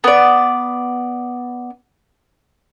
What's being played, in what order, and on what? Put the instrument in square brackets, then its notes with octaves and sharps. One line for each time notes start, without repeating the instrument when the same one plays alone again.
[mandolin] B3 D5